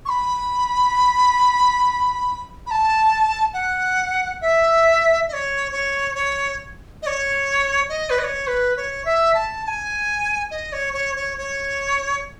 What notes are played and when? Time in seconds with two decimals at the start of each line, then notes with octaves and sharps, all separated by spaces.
0.05 C#6
0.09 B5
2.66 B5
2.71 A5
3.54 F#5
4.41 E5
5.28 D#5
5.33 C#5
5.72 C#5
6.15 C#5
7.02 D#5
7.06 C#5
7.89 D#5
8.10 B4
8.19 D#5
8.23 C#5
8.47 B4
8.77 C#5
9.05 E5
9.34 A5
9.64 A5
9.67 G#5
10.51 D#5
10.72 C#5
10.93 C#5
11.16 C#5
11.37 C#5